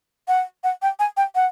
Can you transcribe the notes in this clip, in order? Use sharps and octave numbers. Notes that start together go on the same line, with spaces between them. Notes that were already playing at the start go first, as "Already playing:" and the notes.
F#5
F#5
G5
G#5
G5
F#5